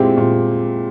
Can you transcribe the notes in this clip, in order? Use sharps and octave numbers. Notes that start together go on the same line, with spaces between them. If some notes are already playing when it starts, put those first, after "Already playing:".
Already playing: A#2 G#3 C4 E4 G4
A#2